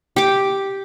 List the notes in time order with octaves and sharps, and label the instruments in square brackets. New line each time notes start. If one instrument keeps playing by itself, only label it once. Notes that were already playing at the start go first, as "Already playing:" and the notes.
[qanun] G4 D6